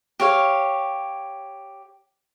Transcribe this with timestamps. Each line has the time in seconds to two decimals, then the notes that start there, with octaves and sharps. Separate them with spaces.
0.20 G4 C#5 F5